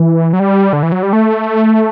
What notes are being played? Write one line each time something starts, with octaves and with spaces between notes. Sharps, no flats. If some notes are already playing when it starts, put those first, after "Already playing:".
Already playing: E3
F#3
G3
D3
E3
F#3
G3
A3